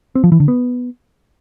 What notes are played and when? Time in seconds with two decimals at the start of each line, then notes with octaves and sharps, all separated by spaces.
0.15 C4
0.24 F3
0.32 E3
0.40 D3
0.48 B3